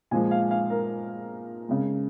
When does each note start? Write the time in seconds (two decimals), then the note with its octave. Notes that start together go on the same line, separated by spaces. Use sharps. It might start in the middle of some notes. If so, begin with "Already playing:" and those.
0.11 A#2 F3 G#3 G#5
0.31 F5
0.51 F5
0.70 A#4
1.69 C#3 G#3